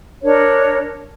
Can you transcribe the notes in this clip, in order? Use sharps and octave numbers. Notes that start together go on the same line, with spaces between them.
D4 A#4 C#5